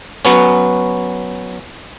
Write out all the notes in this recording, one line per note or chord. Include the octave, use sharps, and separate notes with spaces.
F#3 B3 C#4